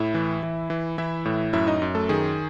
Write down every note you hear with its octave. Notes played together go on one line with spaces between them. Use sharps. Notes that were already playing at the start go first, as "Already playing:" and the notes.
Already playing: A2 E4 E5
E3
E3
E3
E3 E4 E5
A2
F#2 E4 E5
D#4 D#5
F#2
A3 A4
D#3 G#4